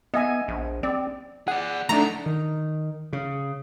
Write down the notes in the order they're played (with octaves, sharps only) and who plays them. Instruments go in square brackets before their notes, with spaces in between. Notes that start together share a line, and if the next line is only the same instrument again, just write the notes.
[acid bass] B3 [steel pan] D#5 E5 G#5
[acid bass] A#1
[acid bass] C4 [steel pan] D5
[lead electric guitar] G#4 D5 [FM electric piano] F#5
[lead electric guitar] F3 D#4 [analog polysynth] A3 D4 [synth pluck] A#5
[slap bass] D#3
C#3